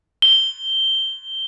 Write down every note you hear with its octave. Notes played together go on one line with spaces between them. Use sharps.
G7